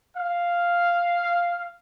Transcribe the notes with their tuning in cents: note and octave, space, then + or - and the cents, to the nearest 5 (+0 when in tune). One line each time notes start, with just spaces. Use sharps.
F5 -5